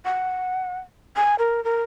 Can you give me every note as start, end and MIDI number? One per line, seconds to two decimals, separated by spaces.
0.05 0.79 78
1.16 1.35 80
1.38 1.63 70
1.64 1.82 70